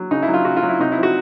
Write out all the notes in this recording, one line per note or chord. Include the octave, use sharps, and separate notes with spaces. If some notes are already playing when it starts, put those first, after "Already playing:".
Already playing: F#3
C#3 D#4
E4
F#3
F4
C#3 F#4
F4
F#3
E4
C3 D#4
E4
F3
F#4